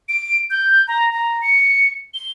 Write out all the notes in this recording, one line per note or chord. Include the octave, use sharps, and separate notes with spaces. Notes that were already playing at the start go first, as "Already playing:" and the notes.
D7
G6
A#5
A#5
C#7
G7